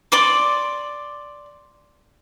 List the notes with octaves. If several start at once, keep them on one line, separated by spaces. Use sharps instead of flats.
D5 C6 D6